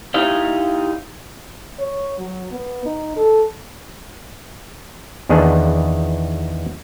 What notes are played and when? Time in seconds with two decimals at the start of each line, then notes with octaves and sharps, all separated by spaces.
0.14 D#4 E4 G4 D#5 F5
1.79 C#5
2.19 F#3
2.52 B3
2.85 D#4
3.17 A4
5.29 E2 D#3 B3 D4 G#4